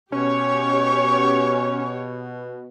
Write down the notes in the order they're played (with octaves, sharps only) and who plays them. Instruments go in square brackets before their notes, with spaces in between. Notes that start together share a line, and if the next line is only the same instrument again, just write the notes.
[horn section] B2 [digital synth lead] C#4 [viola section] G4 C#5 [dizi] C#6